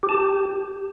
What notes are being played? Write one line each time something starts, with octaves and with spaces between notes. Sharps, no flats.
G4
A5
G4